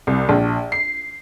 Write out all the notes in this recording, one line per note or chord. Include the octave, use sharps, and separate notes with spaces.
C2
A#1
C7